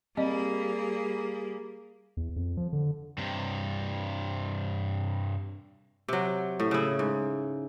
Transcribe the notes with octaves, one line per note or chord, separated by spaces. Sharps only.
G3 A#3 C4 G#4 D5 D#5
E2
F2
F3
D3
G2 C3
C3 F#3
A2
C#3 E4
G#2